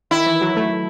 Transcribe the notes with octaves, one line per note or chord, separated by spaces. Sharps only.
D#3 E4
E3
F#3
A3